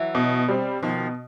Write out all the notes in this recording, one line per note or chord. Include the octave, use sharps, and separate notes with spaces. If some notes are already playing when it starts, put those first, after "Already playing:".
Already playing: E3 F#3
B2
G3 C4
B2 D#3 F3